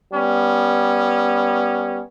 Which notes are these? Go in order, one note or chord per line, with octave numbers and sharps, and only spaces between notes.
G3 B3 C#4